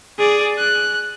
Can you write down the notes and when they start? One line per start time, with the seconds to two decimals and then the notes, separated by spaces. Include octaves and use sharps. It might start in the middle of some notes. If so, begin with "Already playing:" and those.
0.18 G#4 D5
0.59 F#6